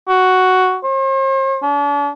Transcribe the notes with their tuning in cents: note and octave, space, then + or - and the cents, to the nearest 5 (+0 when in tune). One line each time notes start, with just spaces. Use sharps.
F#4 +5
C5 +45
D4 -40